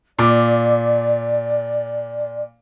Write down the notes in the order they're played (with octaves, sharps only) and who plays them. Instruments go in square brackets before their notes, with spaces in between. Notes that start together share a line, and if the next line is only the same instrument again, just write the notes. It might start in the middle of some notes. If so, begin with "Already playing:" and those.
[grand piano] A#2 D6 [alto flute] D5